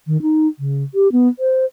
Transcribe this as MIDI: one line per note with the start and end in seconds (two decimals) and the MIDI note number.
0.07 0.20 51
0.22 0.48 63
0.59 0.83 49
0.94 1.11 67
1.12 1.28 59
1.39 1.65 72